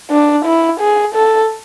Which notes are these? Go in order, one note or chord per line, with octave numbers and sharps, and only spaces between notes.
D4
E4
G#4
A4